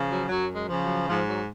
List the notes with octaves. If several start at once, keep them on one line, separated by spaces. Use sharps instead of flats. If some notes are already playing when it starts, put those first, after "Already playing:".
Already playing: C#3 F3
F#3
F#2 F#3
G#3
C#3 F3
F#3
G#2 F3
F#3